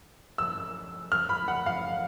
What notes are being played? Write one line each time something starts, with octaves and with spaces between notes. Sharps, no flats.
E6
F6
B5
F#5
F5